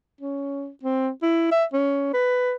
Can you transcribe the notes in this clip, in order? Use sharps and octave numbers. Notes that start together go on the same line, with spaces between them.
C#4
C4
E4
E5
C#4
B4